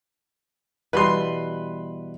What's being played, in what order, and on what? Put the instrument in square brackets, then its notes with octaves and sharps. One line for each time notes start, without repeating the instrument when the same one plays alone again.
[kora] B2 E3 G3 [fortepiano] B4 C6